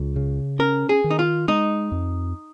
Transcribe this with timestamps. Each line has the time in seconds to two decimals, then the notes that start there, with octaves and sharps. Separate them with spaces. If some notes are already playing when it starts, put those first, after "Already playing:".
Already playing: C#2
0.16 C#3
0.59 C#4 A#4
0.89 G#4
1.04 D#3
1.10 D#4
1.19 F4
1.48 G#3 D#4
1.92 F2